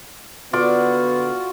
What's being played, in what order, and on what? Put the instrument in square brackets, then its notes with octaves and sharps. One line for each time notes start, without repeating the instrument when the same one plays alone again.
[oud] D3 [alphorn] B3 [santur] F4 D6 [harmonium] F#4